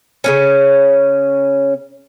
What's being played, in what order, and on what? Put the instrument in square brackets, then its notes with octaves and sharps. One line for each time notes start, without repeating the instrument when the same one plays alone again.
[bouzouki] C#3 B3 C#4